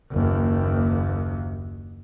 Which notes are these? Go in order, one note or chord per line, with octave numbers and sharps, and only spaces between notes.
F#1 D#2